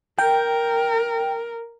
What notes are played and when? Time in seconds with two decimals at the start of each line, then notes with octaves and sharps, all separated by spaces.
0.19 A#4 G5